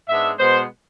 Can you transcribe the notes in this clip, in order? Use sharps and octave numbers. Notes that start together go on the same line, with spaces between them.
G#2 G#3 B3 D4 E5
B2 G#3 B3 C5